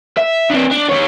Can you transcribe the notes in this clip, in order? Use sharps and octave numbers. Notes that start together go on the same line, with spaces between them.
E5
C4 D4
D4
D#3 C#5